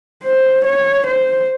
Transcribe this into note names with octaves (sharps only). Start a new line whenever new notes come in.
C5
C#5
C5